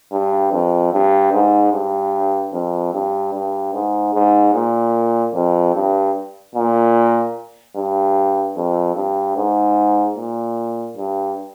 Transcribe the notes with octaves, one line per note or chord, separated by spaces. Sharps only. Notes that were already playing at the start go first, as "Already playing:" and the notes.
G2
F2
G2
G#2
G2
F2
G2
G2
G#2
G#2
A#2
F2
G2
A#2
G2
F2
G2
G#2
A#2
G2